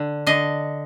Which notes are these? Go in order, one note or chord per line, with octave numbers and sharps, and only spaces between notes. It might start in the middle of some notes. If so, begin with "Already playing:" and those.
Already playing: D3
D3 D#5